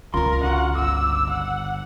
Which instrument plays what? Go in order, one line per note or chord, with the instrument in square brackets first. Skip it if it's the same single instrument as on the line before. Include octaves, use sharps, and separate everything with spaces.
[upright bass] C#2 C#3 [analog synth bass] F4 [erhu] A#4 [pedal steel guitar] C6
[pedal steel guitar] D3 F#4 F5 [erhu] F#5
[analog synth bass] G1 [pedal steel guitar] D6 [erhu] E6
[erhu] F#5